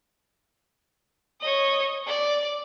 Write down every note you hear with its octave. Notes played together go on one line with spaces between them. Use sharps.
C#5 D#5
D5